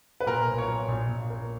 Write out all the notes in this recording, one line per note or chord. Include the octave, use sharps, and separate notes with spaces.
B4
A#2 A#4
B1
C#5
A#2
A#1
A#1
A#3